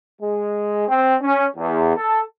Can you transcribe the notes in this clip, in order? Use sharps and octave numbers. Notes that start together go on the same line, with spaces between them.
G#3
C4
C#4
E2
A4